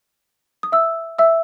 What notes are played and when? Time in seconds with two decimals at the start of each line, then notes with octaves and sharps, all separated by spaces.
0.63 D#6
0.72 E5 E6
1.19 E5 E6